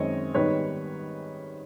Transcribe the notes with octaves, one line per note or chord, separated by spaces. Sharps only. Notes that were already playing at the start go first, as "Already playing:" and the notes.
Already playing: F#2 D#3 G#3 C4 C#5 D#5
G#2 D#3 G3 B3 D#4 B4 C#5